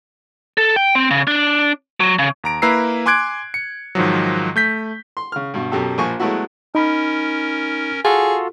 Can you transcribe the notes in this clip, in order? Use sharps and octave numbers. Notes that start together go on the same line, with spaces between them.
A4
G5
C4
C#3
D4
F#3
C#3
D#2 A#5 D7
A#3 E4 B4 A#5 E6 C7
G#5 C6 D6 F#6 G#6 D7
C#7
G#2 D#3 F3 F#3
A3 G6 B6
C6
C#3 F6
G2 B2
F#2 B2 G4 A4
A#1 F3 A#3 F4 G#5 C#6
F#3 G#3 A3 B3 E4 F#4
C#4 D#4 A#4 B5
F4 F#4 G#4 A4